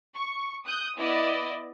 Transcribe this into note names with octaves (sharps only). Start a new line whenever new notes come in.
C#6
D#6 F#6 G6
B3 E4 D5 D#5